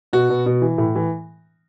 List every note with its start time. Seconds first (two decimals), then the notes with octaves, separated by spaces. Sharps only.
0.13 B2 F#4
0.30 B2
0.46 B2
0.62 E3
0.78 A2
0.95 E3